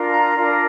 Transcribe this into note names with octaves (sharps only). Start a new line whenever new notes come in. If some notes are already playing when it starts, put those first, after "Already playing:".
Already playing: D4 F4 A#4
A#5
D4 F4 A#4